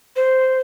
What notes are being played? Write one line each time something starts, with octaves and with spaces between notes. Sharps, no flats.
C5